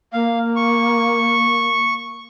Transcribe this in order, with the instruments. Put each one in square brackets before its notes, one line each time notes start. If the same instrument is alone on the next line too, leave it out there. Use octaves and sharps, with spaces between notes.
[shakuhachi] A#3 [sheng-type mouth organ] F5
[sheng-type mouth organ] C#6